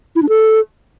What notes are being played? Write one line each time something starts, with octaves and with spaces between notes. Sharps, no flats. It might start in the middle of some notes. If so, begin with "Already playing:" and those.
E4
D4
A4